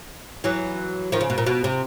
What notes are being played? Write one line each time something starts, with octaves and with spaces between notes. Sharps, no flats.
E3 F#3
D#3 F3
C#3
B2
A#2
B2
C3